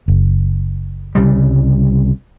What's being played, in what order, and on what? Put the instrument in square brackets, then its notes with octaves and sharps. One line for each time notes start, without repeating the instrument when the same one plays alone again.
[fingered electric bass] F#1
[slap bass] C2 C#3 G3